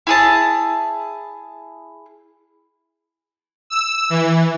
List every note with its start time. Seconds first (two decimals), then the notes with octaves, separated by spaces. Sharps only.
0.07 E4 G#4 A5
3.70 E6
4.10 E3